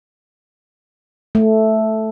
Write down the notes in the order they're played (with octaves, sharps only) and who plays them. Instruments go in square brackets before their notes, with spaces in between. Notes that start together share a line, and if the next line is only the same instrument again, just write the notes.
[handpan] A3